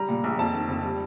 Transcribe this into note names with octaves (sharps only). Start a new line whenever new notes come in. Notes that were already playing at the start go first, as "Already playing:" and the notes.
Already playing: G3 A#5
A#2
A#1
F2 A5
D#3
F2
G3